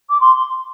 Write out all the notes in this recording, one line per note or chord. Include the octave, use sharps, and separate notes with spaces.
D6
C6